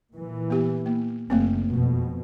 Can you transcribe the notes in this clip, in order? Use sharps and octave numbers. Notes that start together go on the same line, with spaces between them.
A#2 E3
B3 G4
A#3
F#1 A3 A#3 C4
F2 B2